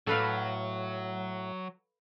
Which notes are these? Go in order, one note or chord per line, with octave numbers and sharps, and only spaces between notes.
A2 F#3 A4 B4 F5